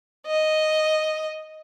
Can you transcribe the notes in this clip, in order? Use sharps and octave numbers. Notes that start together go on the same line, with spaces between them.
D#5